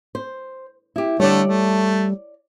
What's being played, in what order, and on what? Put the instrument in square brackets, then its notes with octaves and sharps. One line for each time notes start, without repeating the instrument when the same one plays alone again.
[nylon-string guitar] C5
E4 G4
[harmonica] D3 A3 [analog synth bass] G3 [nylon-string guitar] C#5 D5
[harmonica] A3